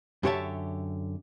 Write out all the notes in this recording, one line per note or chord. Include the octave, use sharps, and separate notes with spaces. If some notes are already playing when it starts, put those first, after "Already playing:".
F#2 D3 G4 C#5 E5 A5